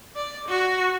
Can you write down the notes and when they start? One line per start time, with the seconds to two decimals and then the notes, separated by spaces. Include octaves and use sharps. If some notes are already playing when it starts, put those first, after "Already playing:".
0.16 D5
0.48 F#4